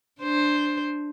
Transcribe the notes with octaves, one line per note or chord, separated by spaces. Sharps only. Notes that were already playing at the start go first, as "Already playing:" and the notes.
D4 C5